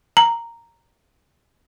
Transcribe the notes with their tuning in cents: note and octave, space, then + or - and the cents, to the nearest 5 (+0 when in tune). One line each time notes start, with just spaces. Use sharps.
A#5 -5